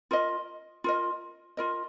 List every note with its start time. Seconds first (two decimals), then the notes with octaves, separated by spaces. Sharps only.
0.11 F4 A#4 D#5
0.84 F4 A#4 D#5
1.57 F4 A#4 D#5